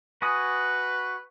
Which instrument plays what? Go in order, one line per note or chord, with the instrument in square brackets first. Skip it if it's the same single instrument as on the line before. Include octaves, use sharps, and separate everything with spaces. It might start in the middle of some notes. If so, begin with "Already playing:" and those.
[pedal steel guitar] F#4 G#5 D#6 [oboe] B4